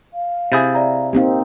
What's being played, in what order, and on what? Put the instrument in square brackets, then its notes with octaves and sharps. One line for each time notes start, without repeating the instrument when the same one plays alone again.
[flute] F5
[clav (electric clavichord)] C3 E4 G#4 [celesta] D#6 G6 A6
[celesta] D5 E5 A#5
[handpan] A#3 C4 D#4 [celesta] G4 F5